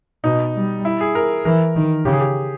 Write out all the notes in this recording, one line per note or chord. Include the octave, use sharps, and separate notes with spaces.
B2 D#4
G3
E4
G#4
A#4
E3 A#4
D#3
C#3 G4
G#4
G4